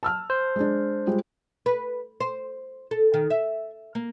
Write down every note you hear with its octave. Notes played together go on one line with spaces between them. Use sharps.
A5 E6 F6
C5
G#3 D4
G3 G#3 F4
B4
C5
A4
D#3
E5
A#3